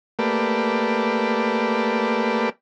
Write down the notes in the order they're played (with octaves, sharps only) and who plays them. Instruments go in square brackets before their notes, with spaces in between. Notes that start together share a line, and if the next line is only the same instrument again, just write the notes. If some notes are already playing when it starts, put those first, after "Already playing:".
[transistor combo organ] A3 A#3 G4 B4 D5